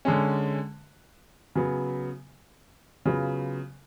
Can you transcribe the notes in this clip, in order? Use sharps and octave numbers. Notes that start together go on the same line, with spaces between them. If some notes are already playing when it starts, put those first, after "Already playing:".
D3 G#3 C#4
C#3 F#3 B3
C#3 F#3 B3 F4 B4